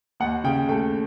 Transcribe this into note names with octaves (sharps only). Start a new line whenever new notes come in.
D#2 F#5
C#3 G5
A3 G5